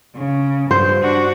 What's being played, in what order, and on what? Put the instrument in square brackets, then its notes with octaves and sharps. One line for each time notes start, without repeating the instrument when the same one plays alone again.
[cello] C#3
[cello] G2 [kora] C5
[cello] D4 F#4